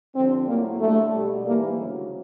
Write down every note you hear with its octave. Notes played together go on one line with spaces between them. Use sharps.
F2 D3 G3 C4
A2 F#3 A3 A#3
D2 D3 G3 A3
B2 G3
G#2 E3 G3 A#3
D2 C#3 F#3